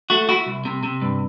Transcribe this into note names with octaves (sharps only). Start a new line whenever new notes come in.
A3 F#4
E4 F#4
C2
C3
C3
G2